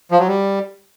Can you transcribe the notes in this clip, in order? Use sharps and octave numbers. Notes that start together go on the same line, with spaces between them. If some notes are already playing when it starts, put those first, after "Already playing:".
F3
F#3
G3